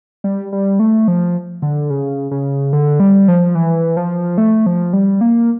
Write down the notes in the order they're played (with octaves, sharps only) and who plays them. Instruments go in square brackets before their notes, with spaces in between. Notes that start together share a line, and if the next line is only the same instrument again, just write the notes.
[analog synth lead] G3
G3
A3
F3
D3
C#3
C#3
D3
G3
F3
E3
F3
A3
F3
G3
A#3